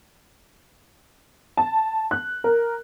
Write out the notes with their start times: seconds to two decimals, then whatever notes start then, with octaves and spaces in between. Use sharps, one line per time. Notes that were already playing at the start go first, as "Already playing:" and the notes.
1.57 A5
2.11 F#6
2.44 A#4